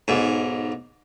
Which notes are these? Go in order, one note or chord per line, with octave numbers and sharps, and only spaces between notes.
B1 G#2